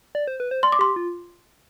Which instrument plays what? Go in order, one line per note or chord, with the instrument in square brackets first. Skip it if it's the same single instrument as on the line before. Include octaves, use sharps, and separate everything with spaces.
[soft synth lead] D5
C5
B4
C5
[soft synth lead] D5 [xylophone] C6
[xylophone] D6
[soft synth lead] G4 [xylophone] C6
[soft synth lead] F4